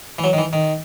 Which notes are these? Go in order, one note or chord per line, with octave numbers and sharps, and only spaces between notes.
E3
F#3
D#3
E3
D#3